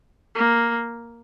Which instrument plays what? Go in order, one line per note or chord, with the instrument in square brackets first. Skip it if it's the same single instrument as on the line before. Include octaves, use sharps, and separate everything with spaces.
[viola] A#3